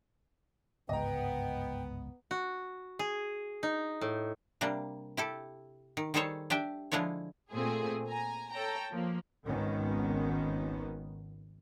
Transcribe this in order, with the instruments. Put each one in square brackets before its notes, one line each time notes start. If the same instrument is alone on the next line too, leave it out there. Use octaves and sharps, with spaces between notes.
[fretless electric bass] G1 C#2 G#2 [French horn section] B3 [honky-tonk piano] D#5 A#5 [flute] G5
[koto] F#4
G#4
D#4
A2
C3 G3 A#3 D4
E4 G4 A4
D#3
D#3 G3 G#4 A4 C5 C#5
D4 G4 E5 G5
D3 F3 G#3 D4 E4 C#5
[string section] A#2 A3 C4 G#4
G#5 A#5
A4 C#5 G5 A#5
F3 A#3
[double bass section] G#1 C#2 D#3 B3 C#4